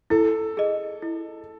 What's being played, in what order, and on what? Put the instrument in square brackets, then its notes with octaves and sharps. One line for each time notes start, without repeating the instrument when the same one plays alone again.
[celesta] E4 [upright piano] A4
[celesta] G#4 D#5
E4